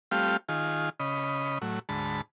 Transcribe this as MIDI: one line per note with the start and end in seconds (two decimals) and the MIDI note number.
0.11 0.37 55
0.11 0.37 57
0.11 0.37 60
0.11 0.37 65
0.11 0.37 67
0.11 0.37 77
0.49 0.89 51
0.49 0.89 65
0.49 0.89 68
1.00 1.58 49
1.00 1.58 75
1.00 1.58 83
1.61 1.79 45
1.61 1.79 54
1.89 2.21 38
1.89 2.21 44
1.89 2.21 81
1.89 2.21 83